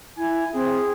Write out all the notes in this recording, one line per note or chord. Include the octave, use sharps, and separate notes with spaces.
E4 G#5
C4 G#4